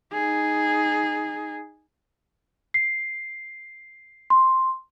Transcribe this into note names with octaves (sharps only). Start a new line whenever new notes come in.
D#4 G#4
C7
C6